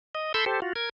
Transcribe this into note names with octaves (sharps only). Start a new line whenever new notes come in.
D#5
A4 B5 C6 E6 G6
G4 A4 C5
F4 F#4
A#4 G#6